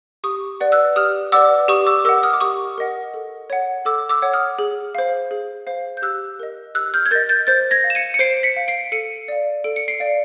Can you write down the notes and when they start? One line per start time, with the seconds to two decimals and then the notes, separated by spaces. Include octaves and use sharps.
0.24 G4 C#6 D#6
0.60 B4 D5 F#5
0.72 E6 F#6
0.96 G4 D#6 F6
1.32 B4 D5 F#5 D6 E6
1.68 G4 C#6 D#6
1.86 D6 E6
2.05 A#4 D#5 F#5 D6 E6
2.23 D#6 F6
2.33 D6
2.41 G4 C#6 D#6
2.78 A#4 D#5 F#5
3.14 A4
3.50 C#5 F#5
3.85 A4 D6 E6
4.09 D6 E6
4.22 C#5 F#5
4.34 D#6 F6
4.59 G#4
4.95 C5 F5
5.31 G#4
5.67 C5 F5
5.97 G6
6.02 G4 E6 F#6
6.39 A#4 D#5
6.75 G4 E6 F#6
6.94 F6 G6
7.06 G#6
7.11 A#4 D#5 G6 A6
7.29 G6 A6
7.47 C5 G6 A6
7.71 G#6 A#6
7.84 F5
7.90 E7
7.95 C#7 D#7
8.14 C#7
8.19 C5 C7 D7
8.43 B6 C#7
8.56 F5
8.68 C7 D7
8.92 A4 C#7 D#7
9.28 D5 F5
9.64 A4 D7
9.76 C#7
9.88 C7 D7
10.00 D5 F5